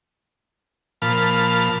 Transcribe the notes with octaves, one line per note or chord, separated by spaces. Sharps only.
A#2 F3 A5 B5 F6